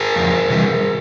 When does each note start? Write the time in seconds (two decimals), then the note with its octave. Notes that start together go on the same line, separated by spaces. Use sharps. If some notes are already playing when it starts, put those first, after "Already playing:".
Already playing: G#4 A#4
0.16 F2
0.50 C3 E3 G3